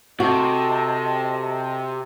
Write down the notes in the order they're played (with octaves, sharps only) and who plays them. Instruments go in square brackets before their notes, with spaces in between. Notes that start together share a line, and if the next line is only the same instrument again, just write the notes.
[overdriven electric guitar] C3 [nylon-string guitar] F#4 [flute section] A4 D#5 A5